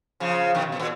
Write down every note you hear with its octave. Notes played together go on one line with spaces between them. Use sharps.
C#3 F3
B2 D#3
B2
A#2